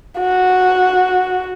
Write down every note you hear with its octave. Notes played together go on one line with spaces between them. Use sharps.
F#4